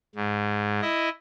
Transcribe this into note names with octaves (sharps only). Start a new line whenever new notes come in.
G#2
E4 D#5